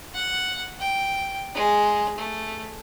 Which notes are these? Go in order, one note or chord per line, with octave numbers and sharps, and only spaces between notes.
F#5
G5
G#3
A3